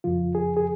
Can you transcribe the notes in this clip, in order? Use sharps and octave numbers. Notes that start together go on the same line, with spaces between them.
F2 C#3 F3 F4
G#4
G#4